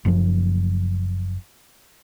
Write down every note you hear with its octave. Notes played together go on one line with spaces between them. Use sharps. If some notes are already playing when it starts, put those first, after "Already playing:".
F#1 F#2 A2 F3